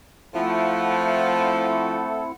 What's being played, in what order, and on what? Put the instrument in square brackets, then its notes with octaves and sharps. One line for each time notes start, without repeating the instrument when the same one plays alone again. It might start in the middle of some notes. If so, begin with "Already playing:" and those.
[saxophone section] F3 [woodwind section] A3 F#5 [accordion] C4 E4 [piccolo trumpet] A4